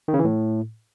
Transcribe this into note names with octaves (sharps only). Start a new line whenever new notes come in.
D#3
C#3
E3
A2